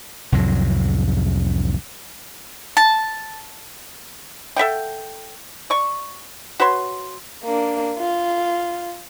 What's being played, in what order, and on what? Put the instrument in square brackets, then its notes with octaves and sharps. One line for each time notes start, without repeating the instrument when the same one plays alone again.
[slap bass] C2 F2 A2 F#3
[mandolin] A5
[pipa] A4 E5 F#5 G5
D5 C#6
F#4 B4 C#5 C6
[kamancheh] A#3 D4
F4